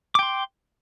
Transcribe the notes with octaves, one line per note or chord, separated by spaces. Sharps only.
G5 C6 D6